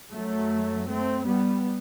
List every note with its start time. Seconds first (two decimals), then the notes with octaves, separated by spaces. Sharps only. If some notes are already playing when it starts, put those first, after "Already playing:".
0.11 F#2 F#3 A3
0.88 A3 C4
1.25 G3 B3